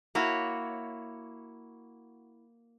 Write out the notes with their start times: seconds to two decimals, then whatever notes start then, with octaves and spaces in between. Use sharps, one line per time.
0.15 A#3 E4 F#4 C#5